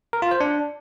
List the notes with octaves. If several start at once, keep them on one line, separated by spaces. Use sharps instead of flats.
A#4
F4
C5
D4